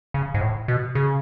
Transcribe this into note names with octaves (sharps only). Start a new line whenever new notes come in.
C#3
G#2
A2
B2
C#3